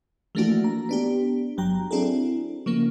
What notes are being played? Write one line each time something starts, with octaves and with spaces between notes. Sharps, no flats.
E3 F3 A3 A#3 D4 F#4
A#5
B3 D4 G4
G1 F#3 G5 A#5
C4 D4 E4 F#4 G#4 A4
C#3 F3 A#3